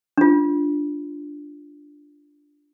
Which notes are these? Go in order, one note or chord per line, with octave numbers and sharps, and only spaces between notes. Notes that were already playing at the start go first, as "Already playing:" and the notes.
D4 F4